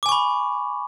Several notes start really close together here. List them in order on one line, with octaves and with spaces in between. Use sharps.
D6 G#5 C#6 B5